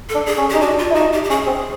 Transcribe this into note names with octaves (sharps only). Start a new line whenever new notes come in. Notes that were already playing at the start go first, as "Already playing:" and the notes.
A4
D4
G#4
C#4
D#4 G4
D4 F#4
F4
E4
D#4 F#4
G4
G4
C#4 G#4
C4